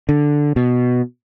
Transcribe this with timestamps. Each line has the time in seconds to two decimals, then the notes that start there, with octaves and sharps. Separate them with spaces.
0.09 D3
0.56 B2